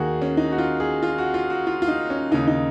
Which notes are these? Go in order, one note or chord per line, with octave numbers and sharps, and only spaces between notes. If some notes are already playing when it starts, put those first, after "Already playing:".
Already playing: D#2 D#3 F#4 G#4
C#4
D#4
F#4
F4
G#4
F4
F#4
F4
F#4
F4
F4
D#4
C#4
D#2 C#3 D#4
D#4